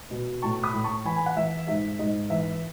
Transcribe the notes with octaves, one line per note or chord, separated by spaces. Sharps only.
B2
A2 A5 C#6
B5 D#6
A2
A5 C#6
E3 G#5 B5
G#5
F#5
E3 E5
G#2 E5
G#2 D#5
E3 E5